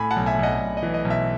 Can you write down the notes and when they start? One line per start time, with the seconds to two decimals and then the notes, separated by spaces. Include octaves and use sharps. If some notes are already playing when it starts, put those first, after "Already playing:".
Already playing: A2 G#5 B5
0.11 F#5 A5
0.16 B1
0.26 E5 G#5
0.39 B1 D#5 F#5
0.60 B1
0.77 D#5
0.83 E3
0.94 D#5
1.05 B1
1.10 E5